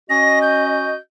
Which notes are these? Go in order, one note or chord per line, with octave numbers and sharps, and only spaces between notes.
C#4 F#4 D#5 A#6
G6